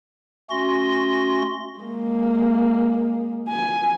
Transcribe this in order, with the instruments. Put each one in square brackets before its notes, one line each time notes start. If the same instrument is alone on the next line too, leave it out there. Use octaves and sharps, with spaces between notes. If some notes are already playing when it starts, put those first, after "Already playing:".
[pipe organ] A3 C#4 F#4 C6 A#6
[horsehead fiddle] G#3 A#3
G#5